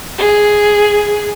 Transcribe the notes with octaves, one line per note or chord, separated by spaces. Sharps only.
G#4